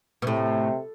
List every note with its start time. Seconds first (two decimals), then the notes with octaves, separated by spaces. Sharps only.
0.22 B2
0.27 A2 C3